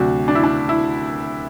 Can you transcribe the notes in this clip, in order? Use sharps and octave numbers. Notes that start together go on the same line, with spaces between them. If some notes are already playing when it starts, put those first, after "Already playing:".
Already playing: D2 C3 F#3 D4 F#4
D4
E4
D4
E4